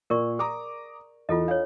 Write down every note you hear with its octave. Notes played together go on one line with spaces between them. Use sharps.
A#2 A#4 D5 C#6
G#4 A#5 D6 D#6
E2 F4 A4 D#5
D4 C#5 F5